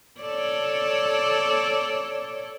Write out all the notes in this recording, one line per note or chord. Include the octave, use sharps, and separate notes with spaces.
A4 C#5 D5